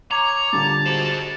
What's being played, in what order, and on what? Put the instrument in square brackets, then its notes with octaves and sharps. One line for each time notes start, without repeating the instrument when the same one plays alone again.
[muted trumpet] C#5 [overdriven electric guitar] A#5 [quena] D6
[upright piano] A#2 D3 G3 [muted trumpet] A5
[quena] F#4 [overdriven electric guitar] G#4 C5